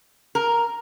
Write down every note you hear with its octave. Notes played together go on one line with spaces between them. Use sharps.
A#4